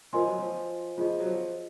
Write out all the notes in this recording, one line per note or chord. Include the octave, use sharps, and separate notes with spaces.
F3 F4 A#4 D#5 G#5 C6
F#3
F3
F3 F4 G#4 D#5
F#3
F3